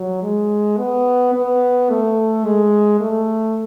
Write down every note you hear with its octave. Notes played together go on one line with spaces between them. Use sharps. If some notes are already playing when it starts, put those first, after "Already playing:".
Already playing: F#3
G#3
B3
B3
A3
G#3
A3